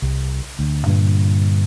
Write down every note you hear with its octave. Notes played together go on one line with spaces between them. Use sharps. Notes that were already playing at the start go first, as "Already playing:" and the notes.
C2
D2
G2 A#2 D3